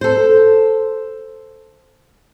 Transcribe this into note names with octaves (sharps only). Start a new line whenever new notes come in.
A4 C5